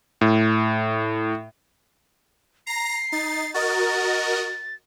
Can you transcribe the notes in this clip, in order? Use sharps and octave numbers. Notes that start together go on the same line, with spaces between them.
A2
A#5 A#6 C7
D#4 A6
F#4 A#4 D#5 A6